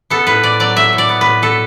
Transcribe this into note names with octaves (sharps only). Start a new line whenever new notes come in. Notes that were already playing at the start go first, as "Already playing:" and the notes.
B3 A4
A2 B4
A2 D5
F#3 D5
A2 E5
A2
D5
B3
A2 B4
B2 A4